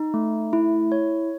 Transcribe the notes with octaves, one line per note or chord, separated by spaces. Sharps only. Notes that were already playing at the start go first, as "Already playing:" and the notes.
Already playing: D#4
A3
E4
C#5